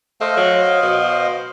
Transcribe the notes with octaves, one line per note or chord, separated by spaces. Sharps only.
A3 C5 D#5 F5
F#3
B2